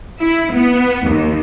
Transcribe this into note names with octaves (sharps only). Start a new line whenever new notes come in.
E4
B3
D#2